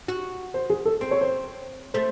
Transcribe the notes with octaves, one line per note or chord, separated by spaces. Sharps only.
F#4
C5
G#4
A4
C4 C5
C#5
C5
A3 C5